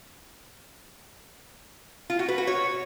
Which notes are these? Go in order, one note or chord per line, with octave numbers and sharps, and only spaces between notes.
F4
F#4
B4
F#4
C#5